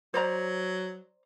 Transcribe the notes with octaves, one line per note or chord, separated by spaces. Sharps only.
F#3 C5 D5 A#5